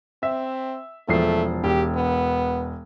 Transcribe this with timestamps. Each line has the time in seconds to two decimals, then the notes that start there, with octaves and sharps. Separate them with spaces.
0.23 C4 E5
1.09 E1 F3 A3 C7
1.64 E1 G4
1.96 B3